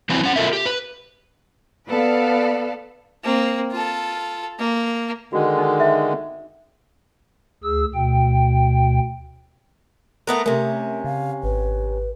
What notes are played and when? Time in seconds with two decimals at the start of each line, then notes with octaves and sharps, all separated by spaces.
0.09 E3 F#3 C4 E4 B4 G#5
0.23 C#4 F#5
0.36 F4 A4 A#4 E5
0.53 G4
0.66 B4
1.89 B3 A4 B4 D5 F5
3.24 A#3 C4
3.71 F4 A4
4.59 A#3
5.33 D3 D#3 G#3 F#4
5.58 D#4
5.80 E5
7.64 D2 G#4 E6
7.94 D2 B2 G5
10.27 A3 B3 A#4
10.46 C3 A3 C#4 A#4 E5
11.04 C#3 F5
11.43 G#1 B4